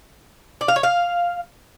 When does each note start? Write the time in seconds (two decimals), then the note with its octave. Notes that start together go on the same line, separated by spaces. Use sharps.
0.61 D5
0.68 F5
0.76 C#5
0.83 F5